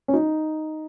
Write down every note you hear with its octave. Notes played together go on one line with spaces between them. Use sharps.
C#4
D#4